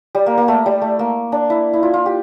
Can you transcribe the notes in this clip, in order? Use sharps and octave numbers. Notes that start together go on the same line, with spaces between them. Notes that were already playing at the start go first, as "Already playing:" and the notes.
G3
A#3
A#3
A3
G3
A3
A#3
D4
E4
E4
F4
F4
G4